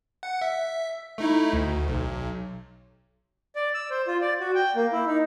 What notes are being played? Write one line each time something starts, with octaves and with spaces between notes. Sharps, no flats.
F#5
E5
A3 D#4 E4
D2
B1
D5
E6
C5
F4
D5
F#4
G5
A#3
E4
D#4